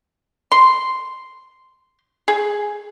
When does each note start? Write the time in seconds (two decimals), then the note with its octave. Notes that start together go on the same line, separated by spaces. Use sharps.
0.52 C6
2.28 G#4